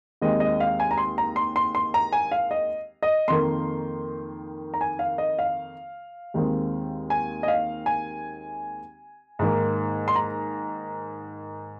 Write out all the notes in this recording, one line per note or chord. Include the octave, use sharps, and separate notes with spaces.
D#2 D#3 G#3 C4 D#5
D#5
F5
G#5
A#5
C6
A#5
C6
C6
C6
A#5
G#5
F5
D#5
D#5
F2 D#3 A#3 C6
A#5
G#5
F5
D#5
F5
D#2 D#3 G#3 C4
G#5
D#5
F5
G#5
G#2 D#3 A#3
C6
A#5